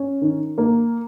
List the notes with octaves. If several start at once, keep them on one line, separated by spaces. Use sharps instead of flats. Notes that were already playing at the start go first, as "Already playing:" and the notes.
Already playing: C#4
D#3
A#3